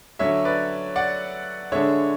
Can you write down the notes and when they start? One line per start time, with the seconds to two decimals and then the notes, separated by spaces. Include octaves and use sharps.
0.19 D3 F#3 C#4 C#5 E5
0.45 B4 D5
0.96 D5 F#5
1.72 D3 G#3 D4 C#5 E5